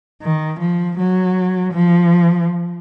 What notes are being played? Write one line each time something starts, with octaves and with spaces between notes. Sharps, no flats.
D#3
F3
F#3
F3